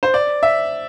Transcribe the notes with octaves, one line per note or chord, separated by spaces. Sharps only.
C5
D5
E5